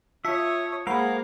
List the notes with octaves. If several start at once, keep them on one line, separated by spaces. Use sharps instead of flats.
F4 C#5 E5 A5 D#6 C#7
G#3 A#3 G#4 A#4 C5 F5 F#5 B5